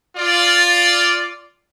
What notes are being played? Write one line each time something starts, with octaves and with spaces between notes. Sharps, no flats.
F4 D5